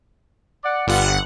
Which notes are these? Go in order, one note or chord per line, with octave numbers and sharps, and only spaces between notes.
D5 F#5
G1 G3 B3 F4 F#5